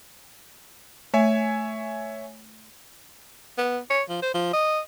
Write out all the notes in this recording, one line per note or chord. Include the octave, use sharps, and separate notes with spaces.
A3 C#5 E5 G#5
B3
C#5
F3
C5
F3
D#5